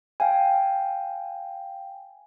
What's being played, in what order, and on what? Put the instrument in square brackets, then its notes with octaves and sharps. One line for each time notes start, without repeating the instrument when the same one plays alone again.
[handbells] F5 G5 G#5